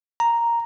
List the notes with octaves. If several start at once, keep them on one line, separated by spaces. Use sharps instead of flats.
A#5